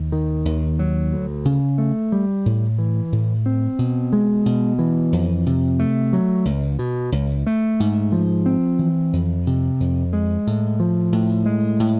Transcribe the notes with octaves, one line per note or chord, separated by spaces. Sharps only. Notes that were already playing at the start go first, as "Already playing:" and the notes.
Already playing: D#2
D#3
D#2
F#3
D2
C#3
A3
G3
A2
E3
A2
C4
B2
G#3
B2
E3
F2
C3
A3
F#3
C#2
B2
C#2
A3
G#2
F3
C4
E3
F2
C3
F2
G#3
A2
F3
A2
G#3
A2